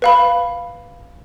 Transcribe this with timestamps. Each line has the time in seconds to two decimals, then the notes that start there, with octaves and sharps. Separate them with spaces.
0.02 B4 F5 B5